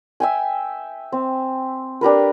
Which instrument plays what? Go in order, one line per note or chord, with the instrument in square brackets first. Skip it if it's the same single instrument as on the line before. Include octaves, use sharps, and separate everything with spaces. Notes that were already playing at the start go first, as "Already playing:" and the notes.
[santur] E5 G5 G#5
C4
D4 G4 A#4 B4